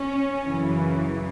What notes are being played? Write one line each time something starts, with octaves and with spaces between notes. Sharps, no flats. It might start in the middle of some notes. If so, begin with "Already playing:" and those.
Already playing: C#4
F#2 C#3 E3